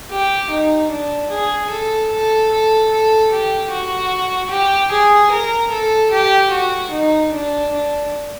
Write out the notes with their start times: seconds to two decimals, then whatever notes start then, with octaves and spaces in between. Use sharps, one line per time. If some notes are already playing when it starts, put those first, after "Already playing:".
0.10 G4
0.51 D#4
0.90 D4
1.30 G#4
1.70 A4
2.11 A4
2.51 A4
2.91 A4
3.31 G4
3.71 F#4
4.50 G4
4.91 G#4
5.31 A#4
5.71 A4
6.11 G4
6.51 F#4
6.91 D#4
7.32 D4
7.71 D4